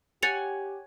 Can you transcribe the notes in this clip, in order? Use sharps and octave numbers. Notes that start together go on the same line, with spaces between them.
G4 C#5 F#5 G#5 A6 C#7 F7